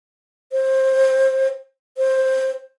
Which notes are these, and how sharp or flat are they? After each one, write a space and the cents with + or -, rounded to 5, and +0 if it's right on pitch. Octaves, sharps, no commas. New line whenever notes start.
C5 +20
C5 +10